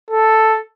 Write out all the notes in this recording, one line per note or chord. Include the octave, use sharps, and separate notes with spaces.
A4